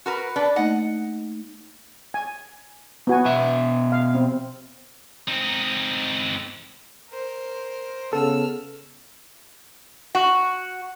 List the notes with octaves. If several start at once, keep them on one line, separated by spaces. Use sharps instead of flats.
F#4 A#4 B4
D4 B4
A3 A#3 D#4 D#5 F#5
G#5
B3 F#4 G#5
B2 E5
F5
C4
C4 D#4
A#4 C5
C#3 B3 A4 E6 F6
F#4